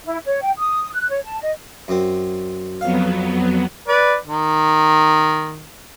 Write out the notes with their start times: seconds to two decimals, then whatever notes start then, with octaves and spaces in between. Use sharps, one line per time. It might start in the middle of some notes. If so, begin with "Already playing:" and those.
0.04 E4
0.26 C#5
0.42 G5
0.58 D#6
0.93 F#6
1.10 C#5
1.25 A5
1.41 D#5
1.88 F#2 C4
2.81 F2 F#3 B3 F5
3.88 B4 D5
4.27 D#3